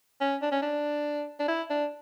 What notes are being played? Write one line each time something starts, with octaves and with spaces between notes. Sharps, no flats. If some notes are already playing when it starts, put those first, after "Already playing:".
C#4
D4
C#4
D4
D4
E4
D4